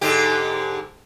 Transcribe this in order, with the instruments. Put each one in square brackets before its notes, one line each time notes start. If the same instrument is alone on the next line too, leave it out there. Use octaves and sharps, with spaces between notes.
[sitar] G#2 D3 G4